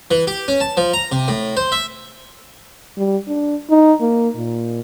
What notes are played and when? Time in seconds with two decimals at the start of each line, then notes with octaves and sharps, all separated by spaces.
0.11 E3
0.27 G4
0.48 C#4
0.60 A5
0.77 F3
0.93 A#5
1.12 C3
1.28 A2
1.57 C5
1.72 E5
2.97 G3
3.28 D4
3.70 D#4
4.01 A#3
4.37 A#2